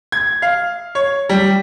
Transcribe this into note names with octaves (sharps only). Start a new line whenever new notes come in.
G#6
F5
C#5
G3